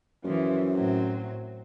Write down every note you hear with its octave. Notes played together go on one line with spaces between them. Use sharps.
F#2 E3 F3
A2 F#3 C4